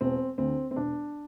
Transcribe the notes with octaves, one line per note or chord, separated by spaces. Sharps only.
E1 C4
D2 D3 C4
C4
E1 D4